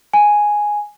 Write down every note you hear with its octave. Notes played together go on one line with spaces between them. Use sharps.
G#5